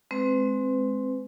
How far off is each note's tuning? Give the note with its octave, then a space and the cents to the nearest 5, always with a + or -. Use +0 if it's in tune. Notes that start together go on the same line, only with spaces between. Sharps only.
G#3 +20 C4 +5 B4 +40